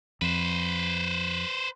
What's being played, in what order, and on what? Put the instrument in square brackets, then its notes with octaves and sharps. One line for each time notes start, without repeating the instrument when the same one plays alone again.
[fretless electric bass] F2 [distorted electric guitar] B4 C5